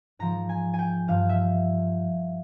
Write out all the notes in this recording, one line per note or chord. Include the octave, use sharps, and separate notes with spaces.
G#2 F3 A#5
G#5
G#5
G5
G2 F3 F5
E5